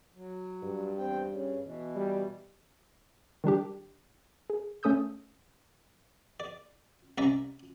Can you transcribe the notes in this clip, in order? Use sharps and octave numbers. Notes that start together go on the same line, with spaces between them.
F#3
G2
E2 C4 G5
C#3
B2 E3
G3
D#3 G3 D4 G4
G#4
A3 C#4 A4 D#6 E6 G6
D5
C2 C#4 D5 E5 A#5